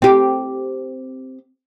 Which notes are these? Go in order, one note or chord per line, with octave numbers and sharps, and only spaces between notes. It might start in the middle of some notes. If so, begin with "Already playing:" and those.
C4 G4